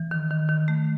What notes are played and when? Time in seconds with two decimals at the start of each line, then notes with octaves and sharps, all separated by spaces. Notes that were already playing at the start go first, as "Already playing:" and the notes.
Already playing: E3
0.11 D#3
0.30 D#3
0.49 D#3
0.68 A3